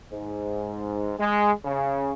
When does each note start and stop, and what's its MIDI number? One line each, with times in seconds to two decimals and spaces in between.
0.11 1.13 44
1.19 1.52 56
1.64 2.13 49